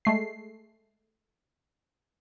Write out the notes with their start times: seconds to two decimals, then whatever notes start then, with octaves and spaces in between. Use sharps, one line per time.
0.05 G#3 A3 C7